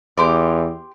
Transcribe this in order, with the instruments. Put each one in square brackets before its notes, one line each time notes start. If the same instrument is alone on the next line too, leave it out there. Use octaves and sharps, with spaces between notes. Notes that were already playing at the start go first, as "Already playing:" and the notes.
[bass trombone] E2 [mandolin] G4 C6 D6